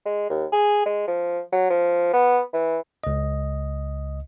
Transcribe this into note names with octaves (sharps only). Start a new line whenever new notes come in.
G#3
D#2
G#4
G#3
F3
F#3
F3
B3
E3
C#2 D#5